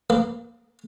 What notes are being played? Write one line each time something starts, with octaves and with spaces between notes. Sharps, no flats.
A#3